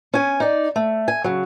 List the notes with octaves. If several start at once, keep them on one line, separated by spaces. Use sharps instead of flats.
C#4 G#5
D#4 D5
A3
G#5
C#3 F#3